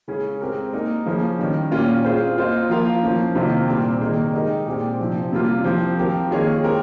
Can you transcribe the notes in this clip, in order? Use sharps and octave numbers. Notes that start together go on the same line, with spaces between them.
C#3 G#3 C#4 G#4
G#3 C4 G4 A#4
A#3 D#4 A#4 D#5
C#3 F3 A#3 C#4
D#3 G3 C#4
A#2 G3 A#3 C#4 F4
C4 F4 G#4 C5
A#3 F4 C5 D#5
F3 A#3 F4 A#4 F5
F3 A#3 C#4
C3 D#3 A#3 F4 C5
A#2 G3 C4
C3 D#3 A#3 D#4 G#4
G#3 D#4 G4 A#4 D#5
A#2 G#3 C4 G4
C3 F3 C4
C3 G3 A#3 C#4 F4
F3 C4 G4
F3 C4 G4 A#4
D#3 A#3 F4 G#4 C#5
G#3 C4 G4 A#4